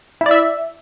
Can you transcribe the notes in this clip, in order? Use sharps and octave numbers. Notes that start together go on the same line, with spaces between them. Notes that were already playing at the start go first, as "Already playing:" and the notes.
E4 D5 E5